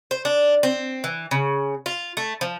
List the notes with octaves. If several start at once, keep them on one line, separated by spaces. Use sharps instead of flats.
C5
D4
C4
E3
C#3
F4
A3
F3